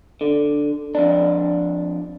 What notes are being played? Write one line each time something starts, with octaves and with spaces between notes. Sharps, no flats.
D3
F2 D4